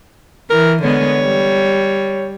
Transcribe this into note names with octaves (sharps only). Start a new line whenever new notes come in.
E3 A#4
D3 G#3 B3 C#5
G3